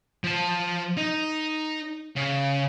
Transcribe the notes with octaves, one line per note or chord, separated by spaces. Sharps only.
F3 A5
D#4
C#3